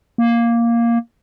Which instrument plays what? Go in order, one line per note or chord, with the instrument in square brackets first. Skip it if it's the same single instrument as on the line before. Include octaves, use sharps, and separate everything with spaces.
[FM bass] A#3